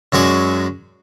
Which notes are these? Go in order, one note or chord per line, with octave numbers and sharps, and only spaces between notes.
F#2 F#3 G#3 F#4 D5